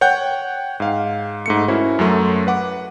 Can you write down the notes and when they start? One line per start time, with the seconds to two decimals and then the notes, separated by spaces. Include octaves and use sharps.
0.01 C#5 F#5 G5 F#6 G6
0.80 G#2 F5
1.46 G#2 A3 C#7
1.68 C#4 E4 F#4 A#4 C5
1.99 F#2 F#3 A3 C6
2.47 B4 F#5 D6